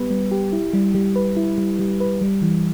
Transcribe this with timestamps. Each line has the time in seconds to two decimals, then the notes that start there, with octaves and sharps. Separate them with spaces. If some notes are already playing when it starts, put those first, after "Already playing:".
Already playing: G3 B3 G4 B4
0.10 G3
0.31 G4
0.53 E4
0.73 G3
0.95 G3
1.16 B4
1.37 E4
1.58 G3
1.79 G3
2.00 B4
2.21 G3
2.42 E3